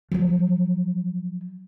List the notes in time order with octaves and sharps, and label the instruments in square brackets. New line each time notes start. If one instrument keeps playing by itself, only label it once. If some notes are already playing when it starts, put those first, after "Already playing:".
[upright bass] F3 F#3